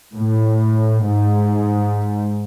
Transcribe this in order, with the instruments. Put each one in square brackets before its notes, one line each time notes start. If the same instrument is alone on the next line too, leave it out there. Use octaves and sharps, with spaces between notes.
[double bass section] A2
G#2